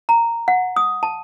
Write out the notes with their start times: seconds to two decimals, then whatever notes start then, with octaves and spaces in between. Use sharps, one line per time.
0.09 A#5
0.48 F#5
0.76 D#6
1.03 A5